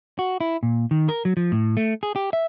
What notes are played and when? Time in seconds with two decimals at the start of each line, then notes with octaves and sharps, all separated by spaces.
0.19 F#4
0.41 E4
0.63 A#2
0.91 D#3
1.09 A#4
1.25 F#3
1.37 F3
1.52 A2
1.77 A3
2.03 G#4
2.16 G4
2.33 E5